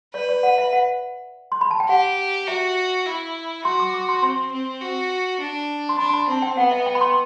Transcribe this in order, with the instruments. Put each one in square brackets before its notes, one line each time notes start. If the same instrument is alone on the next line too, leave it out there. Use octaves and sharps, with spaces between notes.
[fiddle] B4 [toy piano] D5
[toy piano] D5
F#5
E5
F#5
C6
B5
A5
G5
[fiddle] G4 [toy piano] F#5
[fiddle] F#4 [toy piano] E5
[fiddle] E4
[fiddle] F#4 [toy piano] C6
[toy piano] D6
D6
C6
[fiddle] C4 [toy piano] C6
[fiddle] C4
F#4
D4
[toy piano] C6
[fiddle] D4 [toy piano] B5
[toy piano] C6
B5
[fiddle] C4 [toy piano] A5
[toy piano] G5
[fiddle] B3 [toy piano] F#5
[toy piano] E5
G5
B5
C6